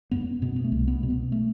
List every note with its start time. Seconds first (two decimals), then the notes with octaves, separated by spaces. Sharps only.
0.11 F#2 B3
0.42 B2 B3
0.56 B3
0.64 A3
0.72 C2
0.87 B3
1.03 B2
1.10 B3
1.32 A3